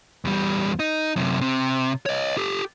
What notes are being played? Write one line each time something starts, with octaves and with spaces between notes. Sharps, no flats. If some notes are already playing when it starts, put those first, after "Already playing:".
E2 G3
D#4
F#2 C3
C3
C#5 D#5
G4 A4